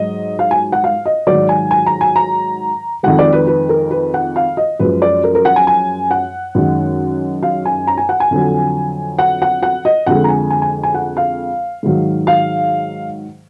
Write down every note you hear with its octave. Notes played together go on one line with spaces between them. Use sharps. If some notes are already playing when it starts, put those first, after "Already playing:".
Already playing: G#2 F#3 D#5
F5
G#5
F#5
F5
D#5
G#2 D#3 F#3 D5
G#5
G#5
A#5
G#5
A#5
F2 D#3 G#3 F#5
D5
B4
B4
A#4
B4
F#5
F5
D#5
F#2 F3 G#3 B4
D5
A#4
A#4
F#5
G#5
G#5
F#5
F#2 D#3 G#3
F5
G#5
A#5
G#5
F#5
G#5
F2 D3 F#3
F#5
F#5
F#5
D#5
F2 D3 G#3 F#5
A#5
G#5
G#5
G#5
G#5
F#5
F5
G#2 D#3 F#3
F5